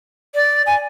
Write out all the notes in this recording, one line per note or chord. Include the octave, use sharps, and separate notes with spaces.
D5
G#5